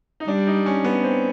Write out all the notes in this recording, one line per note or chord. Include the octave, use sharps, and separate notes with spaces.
D#4
G3 D4
D#4
C#4
B3
C4